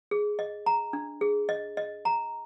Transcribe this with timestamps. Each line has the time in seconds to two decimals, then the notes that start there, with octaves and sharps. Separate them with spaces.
0.11 G#4
0.39 D#5
0.66 A#5
0.93 D4
1.21 G#4
1.49 D#5
1.77 D#5
2.05 A#5